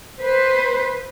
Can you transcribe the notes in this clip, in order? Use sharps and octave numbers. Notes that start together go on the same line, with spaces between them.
B4 C5